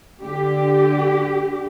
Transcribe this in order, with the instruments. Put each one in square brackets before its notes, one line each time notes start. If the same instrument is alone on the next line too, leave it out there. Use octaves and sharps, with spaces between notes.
[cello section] D3 G4